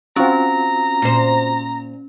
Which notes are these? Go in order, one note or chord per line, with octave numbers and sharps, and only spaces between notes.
C4 C#4 F4 F#4 A#5
A#2 C5